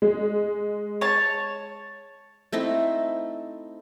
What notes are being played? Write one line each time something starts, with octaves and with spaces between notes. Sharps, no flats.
G#3
C#5 A5
A3 C4 D#4 E4